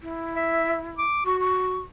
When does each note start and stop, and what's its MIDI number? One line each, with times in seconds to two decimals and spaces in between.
0.01 1.04 64
0.35 0.77 76
0.98 1.22 86
1.26 1.81 66
1.26 1.37 85
1.41 1.82 85